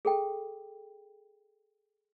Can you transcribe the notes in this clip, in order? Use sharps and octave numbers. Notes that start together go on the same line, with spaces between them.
G#4 A4 G5